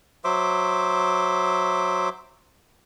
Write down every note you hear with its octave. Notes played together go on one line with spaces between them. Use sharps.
F#3 C5 E5 D6